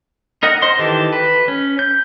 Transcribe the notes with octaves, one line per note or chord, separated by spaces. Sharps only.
D#4 A#4 D#5 F#5
C5 D#5 C6
D#3 E3 G4 A4 A5
B4
C#4
G6